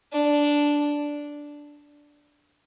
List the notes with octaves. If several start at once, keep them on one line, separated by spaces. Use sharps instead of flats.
D4